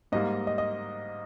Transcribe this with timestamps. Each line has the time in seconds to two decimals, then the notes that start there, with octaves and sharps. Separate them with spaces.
0.12 G#2 G3 A#3 D#5
0.47 D#5
0.58 D#5